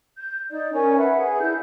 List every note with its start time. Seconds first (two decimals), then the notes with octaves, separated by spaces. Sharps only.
0.18 G6
0.50 D#4 D5
0.74 C#4 A#4 C#5 G#5
0.98 B4 E5 F#5
1.17 G#4
1.40 D4 E4 G6